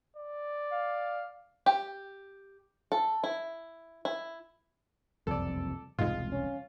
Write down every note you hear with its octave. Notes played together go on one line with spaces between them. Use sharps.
D5
F5
G4
A4
E4
E4
F#1 C2 F2 A4 D5
E1 C2 G#2 G#3 F4
C#4